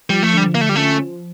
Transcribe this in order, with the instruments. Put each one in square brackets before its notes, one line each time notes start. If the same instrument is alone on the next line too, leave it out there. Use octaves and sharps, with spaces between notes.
[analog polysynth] F3 [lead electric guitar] G3
[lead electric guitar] A3
[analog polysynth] D3 [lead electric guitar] G3
[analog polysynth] D3 [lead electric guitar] A#3
[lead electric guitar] A3
G3
[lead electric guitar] A3 [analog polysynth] C#4
[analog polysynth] F3